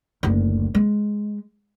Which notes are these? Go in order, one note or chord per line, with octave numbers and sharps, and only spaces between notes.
F#1 D2
G#3